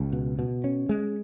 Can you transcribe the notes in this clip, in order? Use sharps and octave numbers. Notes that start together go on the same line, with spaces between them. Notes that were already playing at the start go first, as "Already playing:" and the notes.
Already playing: C#2
B2
B2
C#4
G#3